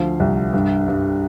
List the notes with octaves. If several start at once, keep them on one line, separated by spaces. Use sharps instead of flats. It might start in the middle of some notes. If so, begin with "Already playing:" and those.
Already playing: D2 F3 F5
C2
G2
G2